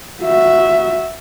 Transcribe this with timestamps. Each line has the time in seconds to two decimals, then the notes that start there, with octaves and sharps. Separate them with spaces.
0.22 F#4 E5